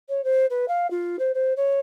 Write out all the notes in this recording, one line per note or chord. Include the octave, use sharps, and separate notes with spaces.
C#5
C5
B4
F5
F4
C5
C5
C#5